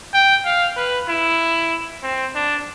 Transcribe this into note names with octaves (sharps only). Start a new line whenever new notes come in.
G5
F5
B4
E4
C4
D4